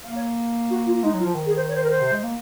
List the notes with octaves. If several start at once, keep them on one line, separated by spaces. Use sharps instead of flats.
A#3 F5
C#5
F#4
F4
G#3 D#4
F#3 F4
F3
D#3
G#4
C5
C#5
C5
A#4
C5
C3
G#3
A#3